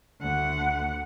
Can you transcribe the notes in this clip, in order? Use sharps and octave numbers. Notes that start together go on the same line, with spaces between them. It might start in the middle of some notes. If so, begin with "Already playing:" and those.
D2 F#5